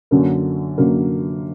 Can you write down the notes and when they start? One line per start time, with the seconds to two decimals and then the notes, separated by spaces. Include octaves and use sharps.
0.11 F#2 D3 F#3 A#3
0.78 F#2 D3 F#3 A#3